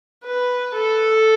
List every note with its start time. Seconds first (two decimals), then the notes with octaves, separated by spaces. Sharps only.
0.25 B4
0.75 A4